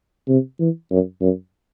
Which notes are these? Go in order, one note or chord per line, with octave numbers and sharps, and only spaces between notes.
C3
E3
F#2
F#2